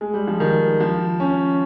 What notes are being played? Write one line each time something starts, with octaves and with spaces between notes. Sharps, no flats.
G#3
G3
F3
D#3
F3
C#4